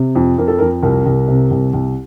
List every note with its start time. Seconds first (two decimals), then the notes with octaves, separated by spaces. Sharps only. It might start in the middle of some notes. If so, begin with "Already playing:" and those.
Already playing: C3
0.15 F2
0.38 F2 A#4
0.48 A4
0.58 F2 A#4
0.82 C2 A#4
1.06 C2
1.28 C3
1.51 C2
1.73 C2